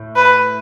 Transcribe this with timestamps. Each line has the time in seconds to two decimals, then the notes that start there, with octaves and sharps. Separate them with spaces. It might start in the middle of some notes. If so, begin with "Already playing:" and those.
Already playing: A2 A3
0.16 B4